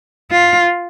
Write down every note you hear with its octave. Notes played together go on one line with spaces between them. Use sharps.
F4